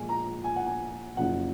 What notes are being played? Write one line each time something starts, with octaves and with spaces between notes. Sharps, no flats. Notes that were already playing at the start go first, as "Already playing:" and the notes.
Already playing: A#1 A#2 G#3 G#5
A#5
G#5
F#5
G#5
F#1 F#2 C#3 F3 F#5